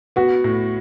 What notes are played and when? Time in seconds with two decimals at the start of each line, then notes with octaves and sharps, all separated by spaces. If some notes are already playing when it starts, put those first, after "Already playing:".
0.16 B3 F#4
0.44 A2